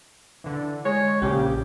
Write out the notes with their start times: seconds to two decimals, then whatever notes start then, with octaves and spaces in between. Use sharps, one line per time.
0.44 D3 E3
0.85 G#3 C#5
1.22 A#1 C#3 G4